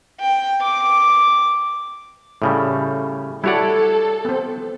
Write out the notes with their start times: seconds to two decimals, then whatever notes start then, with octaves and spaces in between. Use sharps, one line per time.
0.21 G5
0.62 D6
2.42 A2 C#3 G3
3.44 G3 E4 F#4 A4 C#5 D5 F#5
4.25 B3 C4